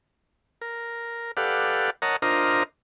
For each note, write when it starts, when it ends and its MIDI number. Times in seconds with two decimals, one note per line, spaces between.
0.62 1.31 70
1.37 1.90 67
1.37 1.90 69
1.37 1.90 71
1.37 1.90 74
1.37 1.90 77
1.37 1.90 78
2.02 2.16 70
2.02 2.16 73
2.02 2.16 75
2.02 2.16 78
2.02 2.16 81
2.02 2.16 82
2.22 2.63 62
2.22 2.63 65
2.22 2.63 70
2.22 2.63 72
2.22 2.63 75
2.22 2.63 82